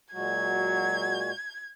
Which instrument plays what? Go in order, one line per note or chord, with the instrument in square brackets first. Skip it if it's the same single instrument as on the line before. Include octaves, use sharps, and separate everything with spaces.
[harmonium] A#2 G#3 F#4 [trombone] F#3 [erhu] G#6